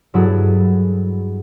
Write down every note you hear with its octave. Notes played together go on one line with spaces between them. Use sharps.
G2 F#3 E4 F#4 G#4 A4